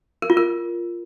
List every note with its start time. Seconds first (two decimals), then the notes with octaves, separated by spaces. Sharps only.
0.22 A#4
0.30 F4
0.37 A#4